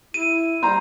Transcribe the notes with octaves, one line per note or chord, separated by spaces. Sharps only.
E4 D#7
G3 C5 A#5